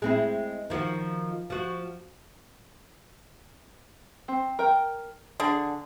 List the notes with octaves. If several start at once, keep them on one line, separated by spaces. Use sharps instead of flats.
G#3 C4 E4
D#3 F3 F#4
F3 F#4
C4
A#4 G5
D3 G#4